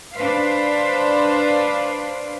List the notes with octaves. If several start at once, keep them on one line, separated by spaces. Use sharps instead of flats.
D4 B4 C5 F5